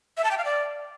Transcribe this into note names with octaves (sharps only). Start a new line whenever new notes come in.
E5
A5
G5
F5
D5